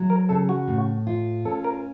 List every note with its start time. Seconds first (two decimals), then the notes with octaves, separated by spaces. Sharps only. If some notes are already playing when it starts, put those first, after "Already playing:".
Already playing: F#3
0.10 A#4
0.29 C#3 A4
0.49 F#4
0.68 A2
1.07 F4
1.45 C#4 A4
1.64 A#4